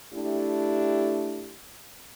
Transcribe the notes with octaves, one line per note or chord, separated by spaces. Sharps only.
A3 D4 E4 G4